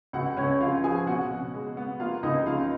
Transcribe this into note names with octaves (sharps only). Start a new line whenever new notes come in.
C#2 F#4 F#5
C#2 C#4 C#5
C#3 F4 F5
F3 G#4 G#5
B2 F#4 F#5
B2
G#3
B3
A#3 F4 F5
C#2 D#4 D#5
C#3 F4 F5